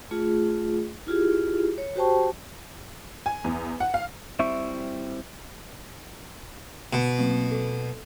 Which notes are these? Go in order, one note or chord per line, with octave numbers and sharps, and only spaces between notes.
A3 F4 G#4
E4 F4 G4 G#4
C#5
F#4 G4 C5 G5 A5 C#6
G#5
E2
F#5
F5
G3 C4 E4 E5 C#6
B2
F#3 A#3 C4
A4